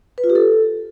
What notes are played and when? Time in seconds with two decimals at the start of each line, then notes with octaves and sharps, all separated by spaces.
0.18 B4
0.24 F4
0.30 G4
0.35 A4